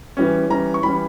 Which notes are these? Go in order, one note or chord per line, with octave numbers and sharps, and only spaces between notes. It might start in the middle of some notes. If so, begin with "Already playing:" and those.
E3 G3 C#4
E3 G3 C#4 A#5
C#6
E3 G3 C#4 B5